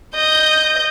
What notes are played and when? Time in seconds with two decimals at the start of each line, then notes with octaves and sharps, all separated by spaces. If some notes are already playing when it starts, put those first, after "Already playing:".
0.16 D#5 G6